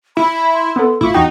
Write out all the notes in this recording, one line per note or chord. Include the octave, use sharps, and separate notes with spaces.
E4 B5
C6
B3 A4
A1 E4 F4 C#6
E2 D#4 F#4 G5